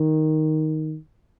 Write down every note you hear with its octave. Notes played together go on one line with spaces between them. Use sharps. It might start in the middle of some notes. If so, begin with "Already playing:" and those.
Already playing: D#3